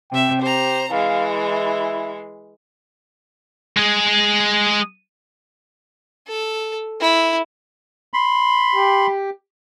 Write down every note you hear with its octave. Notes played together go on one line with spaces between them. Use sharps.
C3 E5 G5
G4 C5 A#5
E3 G#3 F5
E4
G#3 G#4
A4
E4
B5 C6
G4